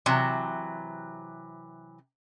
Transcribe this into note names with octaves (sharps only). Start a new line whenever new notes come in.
C3 E3 F#3